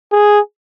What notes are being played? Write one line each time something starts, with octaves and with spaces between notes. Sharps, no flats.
G#4